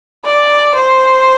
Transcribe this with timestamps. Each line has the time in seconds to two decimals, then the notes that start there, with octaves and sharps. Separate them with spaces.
0.25 D5
0.75 C5